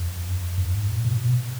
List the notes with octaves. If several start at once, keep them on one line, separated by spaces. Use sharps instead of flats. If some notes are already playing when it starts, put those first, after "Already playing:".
Already playing: F2
F#2
F2
F#2
G#2
A#2
B2
B2